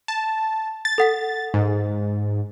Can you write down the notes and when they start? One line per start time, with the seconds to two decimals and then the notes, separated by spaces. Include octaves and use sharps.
0.08 A5
0.85 A6
0.98 A4 F#5 B6
1.54 G#2